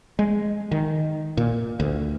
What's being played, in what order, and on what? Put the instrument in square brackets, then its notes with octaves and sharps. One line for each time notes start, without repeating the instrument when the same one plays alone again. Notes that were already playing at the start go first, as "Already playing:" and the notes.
[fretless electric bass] G#3
D#3
A#2
D2